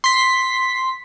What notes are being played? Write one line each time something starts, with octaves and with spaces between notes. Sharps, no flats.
C6 B6